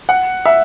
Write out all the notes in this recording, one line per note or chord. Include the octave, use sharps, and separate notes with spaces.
F#5
E5